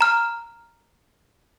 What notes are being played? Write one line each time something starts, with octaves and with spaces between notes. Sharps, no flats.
A#5 F6